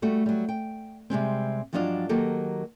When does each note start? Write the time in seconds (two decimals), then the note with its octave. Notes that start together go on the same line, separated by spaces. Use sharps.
0.02 G3 A3 F#4
0.26 F#3 G3
0.49 G5
1.10 C3 G3 G#3 C4
1.73 G2 F3 F#3 D4 D#5 F5
2.09 D#3 F#3 A#3 G4 A4